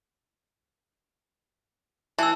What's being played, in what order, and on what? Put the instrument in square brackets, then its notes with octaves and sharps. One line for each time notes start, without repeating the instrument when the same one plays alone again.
[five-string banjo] E3 [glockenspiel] A5 E6